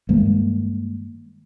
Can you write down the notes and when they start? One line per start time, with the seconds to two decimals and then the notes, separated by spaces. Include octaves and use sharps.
0.09 G2 D#3 G#3 A#3